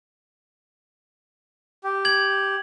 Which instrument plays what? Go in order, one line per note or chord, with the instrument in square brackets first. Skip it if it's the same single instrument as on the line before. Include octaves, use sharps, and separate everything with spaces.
[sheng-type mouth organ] G4
[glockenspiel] G#6 F#7